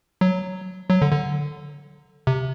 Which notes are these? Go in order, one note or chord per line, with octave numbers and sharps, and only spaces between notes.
F#3
F#3
D3
D3
C3